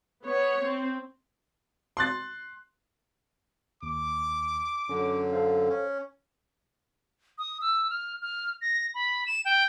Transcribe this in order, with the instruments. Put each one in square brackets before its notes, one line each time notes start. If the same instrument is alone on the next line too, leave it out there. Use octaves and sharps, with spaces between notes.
[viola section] B3 C#5
C4
[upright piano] C6 F#6 A6
[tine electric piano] D#2 [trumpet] D6
[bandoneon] F#2 D3 [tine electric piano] C#4
[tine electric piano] A4 C5 F5
[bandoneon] C#4
[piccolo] D#6
E6
F6
F6
A#6
B5
E7
G5